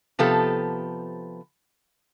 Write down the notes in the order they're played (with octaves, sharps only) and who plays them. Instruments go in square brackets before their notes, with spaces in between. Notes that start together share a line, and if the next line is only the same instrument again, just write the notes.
[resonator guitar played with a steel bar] C3 F3 B3 G4 A4